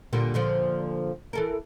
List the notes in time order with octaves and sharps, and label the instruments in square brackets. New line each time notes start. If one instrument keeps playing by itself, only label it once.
[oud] A#2 D3 G3
A#2 D3 F3
E3 A4 A#4